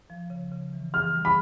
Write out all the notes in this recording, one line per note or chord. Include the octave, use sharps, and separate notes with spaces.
F3
C#3
C#3
E3
E3 F6
G3
B5